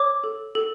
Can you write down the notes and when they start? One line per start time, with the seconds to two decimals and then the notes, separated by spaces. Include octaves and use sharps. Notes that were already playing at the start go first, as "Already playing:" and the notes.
Already playing: C#5 D6
0.24 A4
0.55 A4